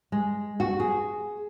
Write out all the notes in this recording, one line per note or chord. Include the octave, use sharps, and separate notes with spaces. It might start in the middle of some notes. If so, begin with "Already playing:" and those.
G#3
F#4
G#4